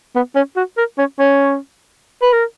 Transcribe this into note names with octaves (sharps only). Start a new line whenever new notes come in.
B3
C#4
F#4
A#4
C#4
C#4
B4
A#4